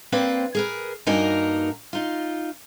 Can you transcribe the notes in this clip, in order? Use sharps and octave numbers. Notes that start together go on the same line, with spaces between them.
A#3 C4 B4 C5 D5 G5
G#4 A#4 B4
G2 A#3 D#4 F#4 A#4 G#5
D#4 F4